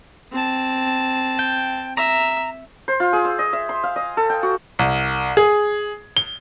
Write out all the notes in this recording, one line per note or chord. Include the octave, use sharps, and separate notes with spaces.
C4 A5
G5
E5 A#5
C5
F4
G#4
E6
D#5
E5
C6
F5
D#5
A4
G5
F#4
C2
G#4
G7